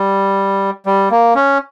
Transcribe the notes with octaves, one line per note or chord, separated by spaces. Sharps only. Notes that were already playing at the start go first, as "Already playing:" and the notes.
Already playing: G3
G3
A#3
C#4